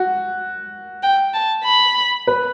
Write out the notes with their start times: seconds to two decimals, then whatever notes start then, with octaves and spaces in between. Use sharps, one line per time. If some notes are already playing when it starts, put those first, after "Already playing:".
Already playing: F#4
1.03 G5
1.34 A5
1.64 B5
2.27 B4